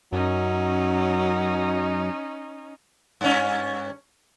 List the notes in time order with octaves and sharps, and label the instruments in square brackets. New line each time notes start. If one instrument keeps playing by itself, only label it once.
[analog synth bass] F#2 [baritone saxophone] F#3 [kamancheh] C#4 D#4
[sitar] G2 C#4